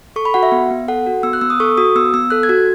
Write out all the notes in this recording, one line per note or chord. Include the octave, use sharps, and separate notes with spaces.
A4 C#6
B5
F#4 F#5
E5
B3
B3
A4 F#5
F#4
B3 E6
F#6
B3 E6
D#6
A4 C#6
F#4 D#6
B3 E6
B3 E6
A4 F#6
G#6
F#4